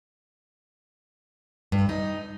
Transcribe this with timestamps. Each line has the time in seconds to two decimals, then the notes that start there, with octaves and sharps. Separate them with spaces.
1.72 G2
1.89 D#4